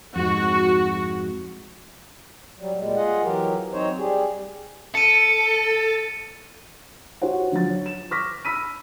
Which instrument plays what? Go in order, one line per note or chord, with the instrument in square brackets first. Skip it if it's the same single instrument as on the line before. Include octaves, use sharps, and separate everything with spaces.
[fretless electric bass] F2 G#2 [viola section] F#4
[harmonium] F#3 G3
A#2 G3 G#3
F4 G#4 D#5 F#5
E3 F#3 G4 A#4
F#3 C4 D#4 C5 C#5
G3 G4 G#4
[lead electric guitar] A4 [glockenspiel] C#7 D#7
[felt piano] F#4 G4 C5 C#5 F#5
D3 F3 F#3 A6
C#5
E7
C#6 D6 F6 A#6 B6
B5 E6 B6 D#7